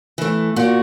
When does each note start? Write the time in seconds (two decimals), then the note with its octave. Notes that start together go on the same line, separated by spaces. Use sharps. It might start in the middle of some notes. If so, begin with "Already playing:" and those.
0.18 E3 A3
0.56 A#2 F#4